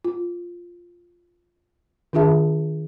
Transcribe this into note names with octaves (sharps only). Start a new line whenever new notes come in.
F4
D#3 D4 F4 G#4 E5 A5